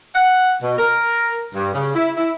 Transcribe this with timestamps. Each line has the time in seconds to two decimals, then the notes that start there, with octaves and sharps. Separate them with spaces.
0.14 F#5
0.62 B2
0.78 A#4
1.54 G2
1.74 C#3
1.95 E4
2.17 E4